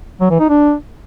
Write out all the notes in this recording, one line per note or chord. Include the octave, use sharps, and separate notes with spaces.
F#3
E3
D#4
D4